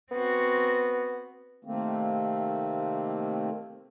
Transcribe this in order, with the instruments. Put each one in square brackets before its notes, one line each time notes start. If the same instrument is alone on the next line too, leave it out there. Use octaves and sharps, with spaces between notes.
[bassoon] B3 [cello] C4 F#4
[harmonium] C3 D#3 A3 A#3 C4